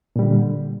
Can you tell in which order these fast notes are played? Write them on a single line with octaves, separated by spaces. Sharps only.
A#2 G3 D3